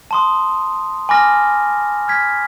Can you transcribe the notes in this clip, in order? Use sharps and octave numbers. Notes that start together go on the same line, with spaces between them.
A5 C6 D#6
G#5 B5 D6 F6 A#6
F6 G#6 B6